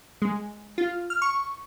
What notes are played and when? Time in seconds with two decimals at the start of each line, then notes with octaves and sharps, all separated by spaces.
0.22 G#3
0.78 F4
1.10 F6
1.22 C#6